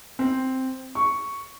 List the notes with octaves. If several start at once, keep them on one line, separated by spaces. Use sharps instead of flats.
C4
C#6